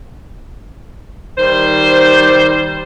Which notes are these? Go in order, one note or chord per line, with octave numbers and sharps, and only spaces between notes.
D#3 G3 C5